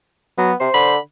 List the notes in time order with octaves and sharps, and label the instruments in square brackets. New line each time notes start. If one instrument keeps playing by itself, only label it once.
[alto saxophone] F#3 [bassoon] B3
[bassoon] C3 [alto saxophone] C5
[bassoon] D3 [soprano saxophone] B5